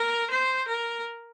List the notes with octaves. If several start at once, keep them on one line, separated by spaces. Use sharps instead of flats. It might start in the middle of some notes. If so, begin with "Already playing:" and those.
Already playing: A#4
C5
A#4